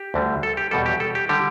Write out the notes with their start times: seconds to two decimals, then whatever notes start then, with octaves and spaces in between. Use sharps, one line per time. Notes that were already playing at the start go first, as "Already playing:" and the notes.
Already playing: G4
0.14 D2 D3 G3
0.43 A4
0.57 G4
0.71 E2 B2 G3 A4
0.86 G4
1.00 A4
1.15 G4
1.29 D3 G3 G4